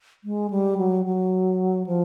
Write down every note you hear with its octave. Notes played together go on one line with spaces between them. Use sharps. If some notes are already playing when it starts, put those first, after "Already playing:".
G#3
G3
F#3
F#3
F3